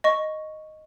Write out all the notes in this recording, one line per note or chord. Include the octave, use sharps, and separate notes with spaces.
D#5 C#6